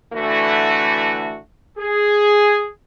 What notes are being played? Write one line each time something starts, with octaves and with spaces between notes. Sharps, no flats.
D3 E3 A3 F#4
G#4